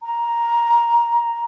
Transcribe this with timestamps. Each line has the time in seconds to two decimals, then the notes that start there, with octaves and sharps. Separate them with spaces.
0.03 A#5